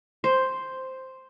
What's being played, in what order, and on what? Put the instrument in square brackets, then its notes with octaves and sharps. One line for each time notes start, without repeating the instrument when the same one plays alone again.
[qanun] C5